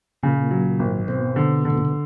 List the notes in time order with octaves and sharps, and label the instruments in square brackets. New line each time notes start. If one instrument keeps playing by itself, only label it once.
[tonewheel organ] A#2 [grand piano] C#3
[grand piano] F#3
G#1
[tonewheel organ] B2 [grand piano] C4
[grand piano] D3
D3
[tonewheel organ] A2
A#2
B2